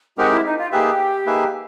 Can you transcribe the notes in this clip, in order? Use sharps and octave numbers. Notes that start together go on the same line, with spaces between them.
G#3 C4 D#4 F#4 G4 A#4
E4
D#4
F4
A#3 D#4 G4 G#4 B4 E5
A#3 D#4 G#4 B4 E5